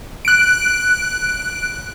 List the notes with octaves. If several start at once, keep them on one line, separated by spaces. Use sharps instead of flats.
F#6 D7